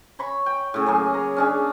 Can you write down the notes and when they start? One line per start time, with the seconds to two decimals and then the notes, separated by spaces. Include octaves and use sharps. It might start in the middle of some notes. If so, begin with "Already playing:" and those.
0.19 C#5 B5 C#6
0.46 G5
0.74 A2 C#3
0.86 F#3 A#3 G#4
1.14 A#5
1.36 C#4 D4 G#4